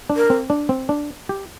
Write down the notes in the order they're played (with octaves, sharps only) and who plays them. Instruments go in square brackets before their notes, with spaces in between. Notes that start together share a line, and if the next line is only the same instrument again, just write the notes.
[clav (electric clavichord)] D4
[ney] A#4
[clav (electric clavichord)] C4
D4
C4
D4
G4